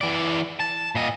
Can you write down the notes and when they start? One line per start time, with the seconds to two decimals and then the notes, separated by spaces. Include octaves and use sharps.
0.01 E3 D5
0.59 A5
0.95 A#2 D#5